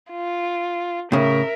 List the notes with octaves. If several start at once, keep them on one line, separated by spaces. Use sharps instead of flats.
F4
A2 C#3 A#4 E5